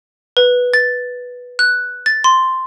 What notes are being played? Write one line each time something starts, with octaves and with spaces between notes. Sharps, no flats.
B4
A6
F#6
A6
C6